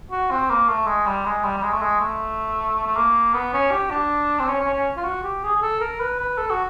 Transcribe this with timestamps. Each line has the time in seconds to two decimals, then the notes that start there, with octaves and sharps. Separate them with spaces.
0.11 F#4
0.31 C4
0.50 A#3
0.69 A3
0.87 G#3
1.07 G3
1.25 G#3
1.44 G3
1.57 G3
1.63 G#3
1.73 A3
1.82 G#3
2.01 A3
2.87 A3
2.97 A#3
3.34 B3
3.53 C#4
3.71 G4
3.91 D4
4.39 C4
4.48 C#4
4.60 C#4
4.73 C#4
4.97 F4
5.04 F#4
5.23 G4
5.43 G#4
5.56 G#4
5.62 A4
5.81 A#4
6.00 B4
6.19 B4
6.38 A4
6.51 F#4